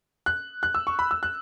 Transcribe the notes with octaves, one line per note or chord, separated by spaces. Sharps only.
F#6
F#6
E6
C#6
B5
E6
F#6